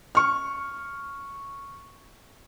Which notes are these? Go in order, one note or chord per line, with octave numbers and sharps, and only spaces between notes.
C#6 F6